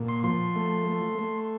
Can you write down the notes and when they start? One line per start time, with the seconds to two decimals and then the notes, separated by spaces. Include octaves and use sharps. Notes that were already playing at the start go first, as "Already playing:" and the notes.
Already playing: A#2
0.08 C6
0.24 F3 C6
0.56 A3
0.87 A3
1.19 A3